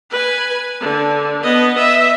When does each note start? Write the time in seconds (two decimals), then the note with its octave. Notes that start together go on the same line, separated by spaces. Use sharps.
0.11 B4 G#5
0.80 D3
1.43 B3 D#5
1.76 D#5 E5